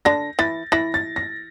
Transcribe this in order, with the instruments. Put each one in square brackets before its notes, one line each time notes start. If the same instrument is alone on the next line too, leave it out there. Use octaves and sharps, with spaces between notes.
[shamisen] D3 D4 [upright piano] A#6
[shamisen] E3 E4 [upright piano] A6
[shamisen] E3 E4 [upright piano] A#6
[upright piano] A6
A#6